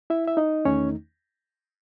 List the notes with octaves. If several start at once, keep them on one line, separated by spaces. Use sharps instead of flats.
E4 E5
E5
D#4 D#5
E2 D#3 A3 C#4 D#4 C#5